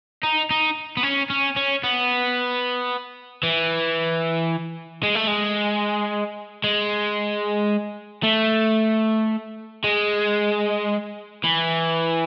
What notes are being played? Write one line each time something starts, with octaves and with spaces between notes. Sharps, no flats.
D#4
D#4
B3
C#4
C#4
C#4
B3
E3
G#3
A3
G#3
G#3
A3
G#3
E3